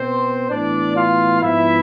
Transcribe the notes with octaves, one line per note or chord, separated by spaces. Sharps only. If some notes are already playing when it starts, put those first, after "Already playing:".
Already playing: B2 B3 C4 C5
A2 E3 B3 D4 D5
F4 F5
G#2 F3 B3 E4 E5